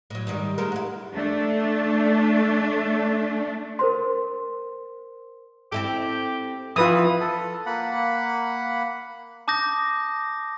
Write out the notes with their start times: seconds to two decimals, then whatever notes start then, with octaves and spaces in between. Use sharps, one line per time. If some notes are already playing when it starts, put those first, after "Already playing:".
0.10 A2 F#3
0.27 G#2 D#3 G3
0.58 G#3 A3 A#4
0.72 E4 F#4
1.13 A3 D4
3.79 A#4 C5 C6
5.72 C4 E4 G4 A4
6.76 E3 F3 F4 B4 D#6
7.20 A4
7.66 A#3 F#5 B5
9.48 A5 D6 D#6 G6 A#6